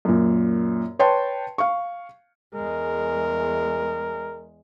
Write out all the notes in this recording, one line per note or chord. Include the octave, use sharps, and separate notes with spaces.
F#2 A#2
B4 C#5 G5 A5 C6
F5 C#6
E2 G#3 A#4